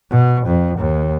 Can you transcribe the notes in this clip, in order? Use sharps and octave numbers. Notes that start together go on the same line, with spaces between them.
B2
F2
D#2